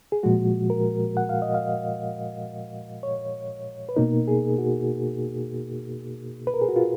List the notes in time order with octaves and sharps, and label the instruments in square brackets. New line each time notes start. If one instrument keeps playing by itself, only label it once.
[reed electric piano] G#4
A#2 F3 G#3 F#4
A#4
F#5
F5
D#5
F5
C#5
B4
B2 A#3 D#4 A#4
G#4
F#4
B4
A#4
G#4
F#4
F4